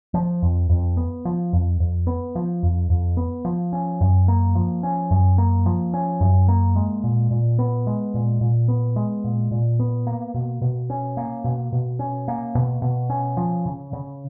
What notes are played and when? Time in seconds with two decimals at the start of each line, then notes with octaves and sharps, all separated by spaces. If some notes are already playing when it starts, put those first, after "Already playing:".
0.14 F3
0.42 F2
0.69 F2
0.97 B3
1.25 F3
1.53 F2
1.80 F2
2.07 B3
2.35 F3
2.63 F2
2.90 F2
3.17 B3
3.45 F3
3.73 C#4
4.01 F#2
4.28 A#3
4.55 F3
4.83 C#4
5.11 F#2
5.38 A#3
5.66 F3
5.94 C#4
6.21 F#2
6.48 A#3
6.76 G#3
7.04 A#2
7.31 A#2
7.59 B3
7.87 G#3
8.14 A#2
8.41 A#2
8.68 B3
8.96 G#3
9.24 A#2
9.51 A#2
9.80 B3
10.07 A#3
10.34 B2
10.62 B2
10.90 C#4
11.17 A#3
11.44 B2
11.72 B2
11.99 C#4
12.28 A#3
12.55 B2
12.82 B2
13.10 C#4
13.37 F3
13.66 C#3
13.93 C#3